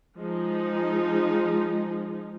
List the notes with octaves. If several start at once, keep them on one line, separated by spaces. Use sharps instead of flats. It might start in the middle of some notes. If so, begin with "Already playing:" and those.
F3 G#3 D#4